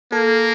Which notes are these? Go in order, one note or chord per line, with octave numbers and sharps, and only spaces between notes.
A#3 A4